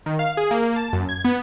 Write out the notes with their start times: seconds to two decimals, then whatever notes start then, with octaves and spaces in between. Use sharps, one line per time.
0.06 D#3
0.19 F5
0.37 G#4
0.51 A#3
0.76 A5
0.93 F#2
1.09 G#6
1.25 B3